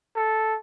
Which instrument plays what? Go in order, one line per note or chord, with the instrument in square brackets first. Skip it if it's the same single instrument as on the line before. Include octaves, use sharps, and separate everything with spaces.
[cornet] A4